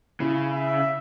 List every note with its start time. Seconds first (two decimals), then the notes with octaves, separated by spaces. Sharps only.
0.20 C#3 E4
0.52 E5